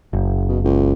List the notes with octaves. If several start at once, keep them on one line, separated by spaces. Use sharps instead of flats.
F#1
B2
C#2